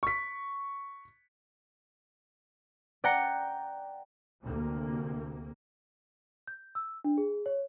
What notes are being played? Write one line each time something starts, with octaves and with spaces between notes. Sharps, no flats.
C#6 B6
D5 F#5 G5 A#5 C#7
D2 C3 A#3
G6
E6
D4
G#4
C#5